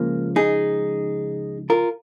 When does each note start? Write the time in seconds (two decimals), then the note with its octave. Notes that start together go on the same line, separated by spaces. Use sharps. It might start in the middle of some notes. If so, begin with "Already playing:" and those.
Already playing: C#2 C#3 F3 A#3
0.36 D#4 G#4
1.70 F4 A#4